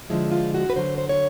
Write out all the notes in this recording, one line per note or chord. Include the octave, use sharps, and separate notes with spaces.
D3 F3 G#3 E4
F4
F#4
B4
D3 F#3 C5
C5
C#5